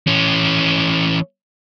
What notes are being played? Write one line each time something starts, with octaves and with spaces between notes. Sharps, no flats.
E3 C#4